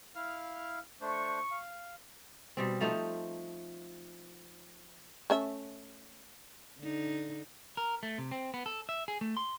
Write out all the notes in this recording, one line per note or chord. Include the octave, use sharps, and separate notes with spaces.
E4 F5 F6
A3 D4 C5 C#6
F5
B2 G3 C4
F3 A3 D#4 C5
A3 C#4 E5
D3 D#4
A#4
A3
C3
C4
B3
A4
E5
G#4
A3
C6